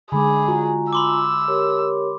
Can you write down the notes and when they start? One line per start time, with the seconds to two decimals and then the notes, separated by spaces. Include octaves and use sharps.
0.12 D3 G#3 G#4 B5 D6
0.48 F4 F#4 G#5 A#5
0.93 B5 C6 D6 E6
1.48 G4 A#4 C#5